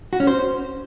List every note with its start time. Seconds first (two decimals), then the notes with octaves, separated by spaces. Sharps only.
0.13 F#4
0.20 C#4
0.27 C5